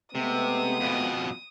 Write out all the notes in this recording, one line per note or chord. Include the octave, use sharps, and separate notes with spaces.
C3 G#3 A3 B3 D#6
F2 B2